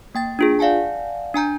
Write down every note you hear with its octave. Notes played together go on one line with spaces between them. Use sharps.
A#3 G5 A6
D4 F4 G#4
D5 F5 F#5 G#5 A5
D4 G#5 A#5 G6